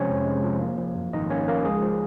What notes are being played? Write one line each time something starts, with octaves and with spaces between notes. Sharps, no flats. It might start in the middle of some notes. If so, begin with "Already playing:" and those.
Already playing: C3 F3 G#3 C4 C#4 C5 C#5
F2
G#3
F3
A#3
F3
F#2
G#1 D#4 D#5
A#3 C#4 C#5
F3 A#3 A#4
C#2 G#3 G#4
F3